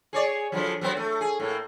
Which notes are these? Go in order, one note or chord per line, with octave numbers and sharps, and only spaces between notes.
G#4 C#5 D5
D3 F3 F#3
F#3 B3 C4
A3
G#4
A2 A#3